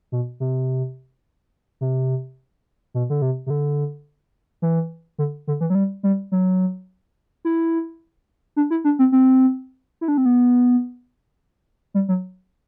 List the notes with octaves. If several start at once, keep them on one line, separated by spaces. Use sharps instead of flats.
B2
C3
C3
B2
D3
C3
C3
D3
E3
D3
D3
E3
F#3
G3
G3
F#3
E4
D4
E4
D4
C4
C4
E4
D4
C4
B3
G3
F#3